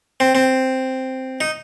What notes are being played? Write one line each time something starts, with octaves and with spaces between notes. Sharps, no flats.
C4
C4
D#4